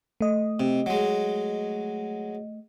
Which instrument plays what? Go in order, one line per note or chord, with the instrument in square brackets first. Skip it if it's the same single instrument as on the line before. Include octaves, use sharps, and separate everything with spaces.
[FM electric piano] A3 D#5
[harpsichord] C3
F#3 G#3